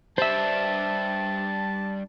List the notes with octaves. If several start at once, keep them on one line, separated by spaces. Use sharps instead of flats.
G3 D4 C5 E5 A5